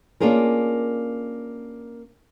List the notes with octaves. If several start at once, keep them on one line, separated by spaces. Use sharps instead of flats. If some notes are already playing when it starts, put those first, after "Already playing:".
A#3 C#4 D4 F4 G#4 A#4